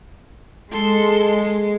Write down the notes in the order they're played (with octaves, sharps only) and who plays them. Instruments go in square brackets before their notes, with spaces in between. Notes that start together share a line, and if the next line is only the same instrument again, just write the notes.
[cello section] G#3 [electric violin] A4 C6